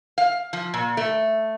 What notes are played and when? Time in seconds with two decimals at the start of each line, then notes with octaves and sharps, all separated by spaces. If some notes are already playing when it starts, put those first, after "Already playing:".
0.18 F5
0.53 F3
0.74 A#2
0.97 A3